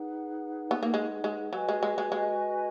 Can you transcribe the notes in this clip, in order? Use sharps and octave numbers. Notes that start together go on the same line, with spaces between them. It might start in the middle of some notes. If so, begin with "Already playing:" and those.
Already playing: D#4 G#4 B4 F#5
B3
A#3
G#3
G#3
F#3 F#4 B4 D#5 G#5
G#3
G#3
G#3
G#3